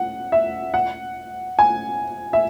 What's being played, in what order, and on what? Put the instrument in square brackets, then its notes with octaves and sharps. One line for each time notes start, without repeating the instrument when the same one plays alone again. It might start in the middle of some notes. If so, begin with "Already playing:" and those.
Already playing: [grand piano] F#5
E5
F#5
G#5
E5